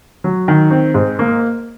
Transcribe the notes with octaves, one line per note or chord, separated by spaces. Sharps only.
F#3
D#3
C4
G#2
A#3